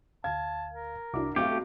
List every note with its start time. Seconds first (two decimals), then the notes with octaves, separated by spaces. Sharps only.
0.24 D2 F5 A5 G#6
0.72 A#4
1.14 C2 D4 E4 F#4 D6
1.36 B1 A3 C4 G4 F5